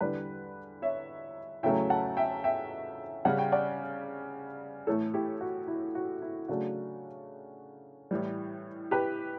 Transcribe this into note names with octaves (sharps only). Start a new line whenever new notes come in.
E2 D3 G3 B4 D5
C#5 E5
E2 C#3 F#3 A3 C#4 E5 G5
F#5 A5
E5 G5
E5 G5
C#3 G3 C#4 F#5
G5
D5 F#5
A2 E3 A3 A4 C#5
E4 G4
F#4
E4
F#4
E4
C#3 F#3 A3 D4 F#4
A2 E3 G3
G4 B4